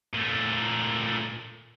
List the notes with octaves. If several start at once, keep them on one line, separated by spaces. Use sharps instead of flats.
A#2 A3